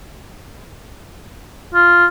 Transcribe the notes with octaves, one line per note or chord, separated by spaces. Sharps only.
F4